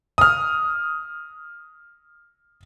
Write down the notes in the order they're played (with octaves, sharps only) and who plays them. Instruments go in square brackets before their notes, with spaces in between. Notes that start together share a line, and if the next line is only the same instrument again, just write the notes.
[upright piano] D#6 F6